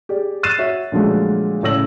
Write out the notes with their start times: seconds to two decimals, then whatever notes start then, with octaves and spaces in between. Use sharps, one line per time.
0.09 G4 G#4 D5
0.43 F6 F#6 A6 C7 D#7 E7
0.59 F#4 C#5 E5
0.92 A#2 D3 F3 F#3 G#3 A3
1.63 A2 C#3 C#5 E6 A#6 F#7